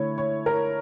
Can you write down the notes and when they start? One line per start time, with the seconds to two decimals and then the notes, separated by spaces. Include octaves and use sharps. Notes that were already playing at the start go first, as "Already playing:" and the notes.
Already playing: D3 A3 E4 C#5
0.18 C#5
0.46 A#4